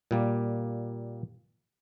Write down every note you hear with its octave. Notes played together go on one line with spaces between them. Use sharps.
A#2 G3 A#3